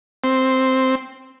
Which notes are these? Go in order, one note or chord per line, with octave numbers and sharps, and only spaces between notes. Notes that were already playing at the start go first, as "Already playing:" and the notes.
C4